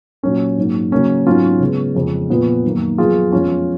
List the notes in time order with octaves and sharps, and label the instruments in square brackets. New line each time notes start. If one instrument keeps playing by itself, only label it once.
[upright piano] A#2 F#3 A#3 C#4
G#2 F#3 A#3
C#3 F#3 A#3 C#4
G#2 F#3 B3 C#4 F4
C#3 G#3 B3
F2 C#3 G#3
A#2 F3 B3
F#2 D#3 A#3
F#2 F3 B3 F4 G#4
F2 F3 G#3 B3 C#4 F4